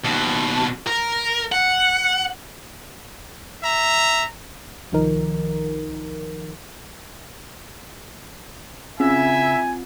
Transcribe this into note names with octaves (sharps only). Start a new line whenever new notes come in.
D#2 B2
A#4
F#5
E5 A#5
C2 D#3 F3 D#4 A#4
C#3 C4 E4 F4 E5 G#5